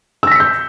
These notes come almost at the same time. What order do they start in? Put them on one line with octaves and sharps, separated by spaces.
E6 A#6 B6 C#7 G6